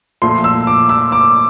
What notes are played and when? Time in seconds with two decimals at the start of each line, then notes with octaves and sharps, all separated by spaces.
0.22 A#2 F3 A3 C6
0.44 E6
0.67 D6
0.89 E6
1.12 D6